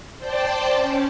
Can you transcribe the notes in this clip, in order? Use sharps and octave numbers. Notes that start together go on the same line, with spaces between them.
C5 D5 G5 A5
C#4